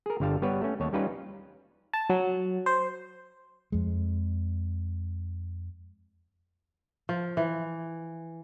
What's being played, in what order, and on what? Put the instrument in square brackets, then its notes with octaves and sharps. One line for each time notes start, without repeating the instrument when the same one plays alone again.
[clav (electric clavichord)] G#4 A#4
G1 D3 G3 F5 A5
G3 B3 B4 C#5
A3 C#4
D#2 C#5 A5
G3 C#4 D#4 F4 B4
[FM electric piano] A5
F#3
C5
[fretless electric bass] F2 G#3
[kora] F3
E3